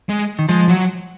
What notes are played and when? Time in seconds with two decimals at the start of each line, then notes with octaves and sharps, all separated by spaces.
0.09 G#3
0.39 D#3
0.49 F3 G#3
0.69 F#3